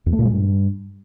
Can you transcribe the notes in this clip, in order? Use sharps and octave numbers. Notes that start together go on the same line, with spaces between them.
E2
A3
A#2
G#3
G2